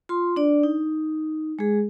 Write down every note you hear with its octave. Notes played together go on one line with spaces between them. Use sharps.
F4 C6
D4 D5
D#4
G#3 G#4